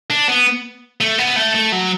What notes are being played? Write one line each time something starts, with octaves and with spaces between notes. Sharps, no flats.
D4
B3
A3
B3
A3
A3
F#3